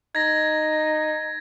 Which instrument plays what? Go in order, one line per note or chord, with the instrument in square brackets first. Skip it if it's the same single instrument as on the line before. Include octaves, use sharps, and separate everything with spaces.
[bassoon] D#4 [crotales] G#6 A#6